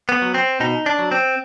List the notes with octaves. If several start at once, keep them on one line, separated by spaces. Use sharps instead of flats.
B3
F#3
C4
B2 D#4
D4
F#3
C4